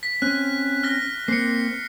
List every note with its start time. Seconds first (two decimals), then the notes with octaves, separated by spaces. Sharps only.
0.03 B6
0.22 C4 C#4 F#6
0.83 F6 A#6
1.28 A#3 C4 C7 C#7